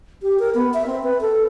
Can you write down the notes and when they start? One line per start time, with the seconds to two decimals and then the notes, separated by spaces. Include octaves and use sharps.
0.23 G4
0.40 A#4
0.54 B3
0.74 E5
0.87 C4
1.03 B4
1.21 A4